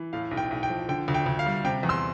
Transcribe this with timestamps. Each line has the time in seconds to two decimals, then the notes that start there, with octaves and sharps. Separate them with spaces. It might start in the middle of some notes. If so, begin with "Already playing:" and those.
Already playing: E3
0.13 A2 F5
0.31 B1
0.37 G5
0.51 B1
0.63 G5
0.69 F3
0.89 D3 G5
1.08 D2
1.14 G5
1.26 D2
1.39 F5
1.46 G3
1.65 C3 G5
1.83 E2
1.89 C6 E6